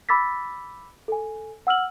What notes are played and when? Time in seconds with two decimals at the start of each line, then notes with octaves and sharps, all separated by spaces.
0.09 B5 D6 E6 A6 B6
1.08 A4 G#5
1.67 F#5 E6 F6 F#7